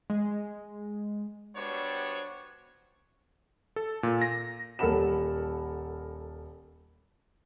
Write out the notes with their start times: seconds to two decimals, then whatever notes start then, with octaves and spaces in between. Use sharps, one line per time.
0.10 G#3
1.56 G3 B3 D4 F#4 C5 C#5
3.76 A4
4.03 A#2
4.22 A#6
4.79 D#1 A4 A#4 F#5 B5 E7